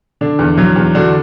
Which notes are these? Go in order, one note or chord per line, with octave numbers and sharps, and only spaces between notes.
D3 D4
E2
F#3
E2
D3 D4 F#4